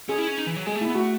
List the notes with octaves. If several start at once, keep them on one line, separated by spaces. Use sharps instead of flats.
C#4 G#4
E4
C#4
D#4
E3
F#3
G#3 G#4
A3
B3 E4
A3 F#4